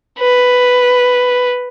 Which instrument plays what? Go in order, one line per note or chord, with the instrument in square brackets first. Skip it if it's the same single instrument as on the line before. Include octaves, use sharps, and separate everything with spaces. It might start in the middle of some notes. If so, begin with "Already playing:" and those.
[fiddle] B4